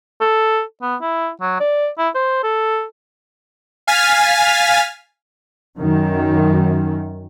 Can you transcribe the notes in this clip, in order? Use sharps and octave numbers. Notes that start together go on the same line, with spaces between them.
A4
B3
E4
F#3
D5
E4
C5
A4
F5 G#5 F6 A6 B6
F#2 D#3